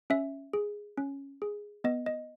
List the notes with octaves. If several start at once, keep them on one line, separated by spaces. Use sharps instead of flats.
C#4 E5
G#4
C#4
G#4
B3 D#5
D#5